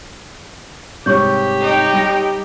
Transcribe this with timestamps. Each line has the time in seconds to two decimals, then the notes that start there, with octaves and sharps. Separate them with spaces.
1.06 G#2 C3 G3 G4 C#5 C#6 G6
1.61 D#4 G5
1.93 G3 A#6